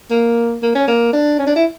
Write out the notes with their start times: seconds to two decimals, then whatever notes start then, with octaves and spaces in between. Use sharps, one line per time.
0.11 A#3
0.63 A#3
0.75 C#4
0.88 A#3
1.13 D4
1.39 C#4
1.47 D4
1.56 E4